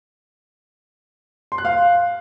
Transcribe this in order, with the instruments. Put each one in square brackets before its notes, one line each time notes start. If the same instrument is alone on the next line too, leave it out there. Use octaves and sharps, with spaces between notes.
[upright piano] C6
F#6
F5